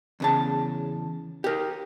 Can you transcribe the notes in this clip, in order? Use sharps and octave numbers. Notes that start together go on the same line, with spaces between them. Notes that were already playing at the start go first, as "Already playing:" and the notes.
E2 C#3 A5
G4 A#4